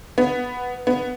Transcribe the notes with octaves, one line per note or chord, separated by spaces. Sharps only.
B3
B3